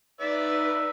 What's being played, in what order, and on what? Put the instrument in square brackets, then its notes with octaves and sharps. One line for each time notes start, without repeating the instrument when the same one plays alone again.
[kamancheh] D#4 B4 [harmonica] D5 E5 E6